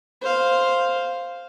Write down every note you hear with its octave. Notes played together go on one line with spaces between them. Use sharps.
C5 F5